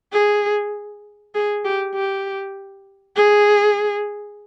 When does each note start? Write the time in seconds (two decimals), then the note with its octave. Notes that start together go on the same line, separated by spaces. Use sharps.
0.13 G#4
1.35 G#4
1.64 G4
1.95 G4
3.16 G#4